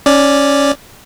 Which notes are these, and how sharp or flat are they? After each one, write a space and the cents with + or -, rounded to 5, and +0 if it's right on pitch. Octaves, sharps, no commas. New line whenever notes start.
C#4 +0 D5 +0